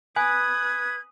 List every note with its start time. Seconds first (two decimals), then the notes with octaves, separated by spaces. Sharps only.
0.16 B4 G#5 D#6 G#6